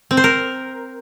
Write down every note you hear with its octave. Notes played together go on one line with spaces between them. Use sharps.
C4
C5
A#4